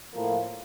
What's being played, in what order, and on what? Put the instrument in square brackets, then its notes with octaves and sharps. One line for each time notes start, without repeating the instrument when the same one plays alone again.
[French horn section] A2 F3 A#3